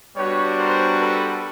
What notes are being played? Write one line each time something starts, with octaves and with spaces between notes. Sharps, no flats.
G3 B3 D4 F#4 B4 C#5
A#4 C5
A4 B4